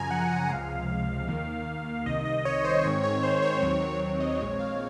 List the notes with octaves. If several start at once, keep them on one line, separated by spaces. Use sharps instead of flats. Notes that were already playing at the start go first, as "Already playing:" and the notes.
Already playing: F#2 C#3 F3 G#5 A#5
F#5
F#5
C#2 C3 F3 G#3 F5
D#2 D#3 A#3
C2 C3 D#3 D#5
D#5
C#5
C5
G#2 D#3 G#3 C4 C#5
C#5
C5
C#5
D#2 D#3 F#3 C4 C#5
C#5
D#5
A#1 A#2 G#3 C4 C#5
F5